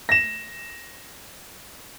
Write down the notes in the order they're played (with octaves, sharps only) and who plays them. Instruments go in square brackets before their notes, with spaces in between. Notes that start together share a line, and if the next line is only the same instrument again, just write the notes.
[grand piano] A#6 E7